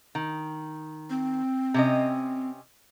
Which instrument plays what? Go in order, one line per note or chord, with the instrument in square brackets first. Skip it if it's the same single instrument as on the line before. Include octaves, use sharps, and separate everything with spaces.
[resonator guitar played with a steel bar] D#3
[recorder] C4
[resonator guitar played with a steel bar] C3 C#4 D#5